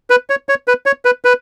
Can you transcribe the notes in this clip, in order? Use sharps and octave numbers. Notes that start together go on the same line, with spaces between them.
B4
C#5
C#5
B4
C#5
B4
B4